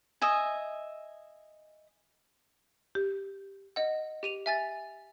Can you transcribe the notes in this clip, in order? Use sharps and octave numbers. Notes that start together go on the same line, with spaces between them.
D#5 E5 G#5
G4
D#5 F#5
G4 D#7 F7
E5 G#5 A6